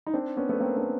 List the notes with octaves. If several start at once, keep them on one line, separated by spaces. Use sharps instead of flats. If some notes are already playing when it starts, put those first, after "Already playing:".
D#4
C4 D4
B3 C#4
A3 B3
A#3 C4
C4 D4